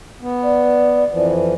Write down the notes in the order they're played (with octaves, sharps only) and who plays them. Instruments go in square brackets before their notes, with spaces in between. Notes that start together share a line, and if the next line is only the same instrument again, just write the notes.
[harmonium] B3
[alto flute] D5
[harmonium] F2 E3 F3